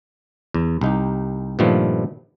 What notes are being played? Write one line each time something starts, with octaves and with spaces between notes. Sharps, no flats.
E2
C2 D#4 G4
G2 A#2 D#3 F3 A3 B3